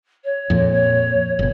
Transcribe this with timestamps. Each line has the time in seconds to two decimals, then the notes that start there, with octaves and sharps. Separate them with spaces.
0.24 C#5
0.50 F2 A#2
0.72 C#5
1.39 G1 B2